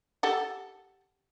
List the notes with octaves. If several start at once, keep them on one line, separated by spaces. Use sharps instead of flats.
G4 A4 F#5